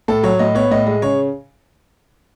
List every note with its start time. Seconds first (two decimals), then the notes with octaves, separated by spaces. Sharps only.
0.08 A2 A4
0.23 F#3 C#5
0.39 A2 D#5
0.55 B3 C#5
0.71 A2 D#5
0.86 G#3 D#5
1.02 C#3 C#5